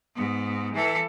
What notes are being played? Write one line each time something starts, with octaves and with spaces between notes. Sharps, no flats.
G#2 B3
E3 A4